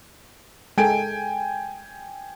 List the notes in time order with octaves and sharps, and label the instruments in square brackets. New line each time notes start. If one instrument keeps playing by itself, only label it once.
[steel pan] G#3 A4 [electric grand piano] G5 G#5 D7